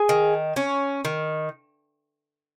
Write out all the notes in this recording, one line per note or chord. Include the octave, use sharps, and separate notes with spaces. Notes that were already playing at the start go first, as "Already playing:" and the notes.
Already playing: G#4 G#5
D#3
C#4
D#3